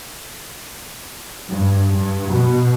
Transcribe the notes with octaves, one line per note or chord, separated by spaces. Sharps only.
G2
G2
B2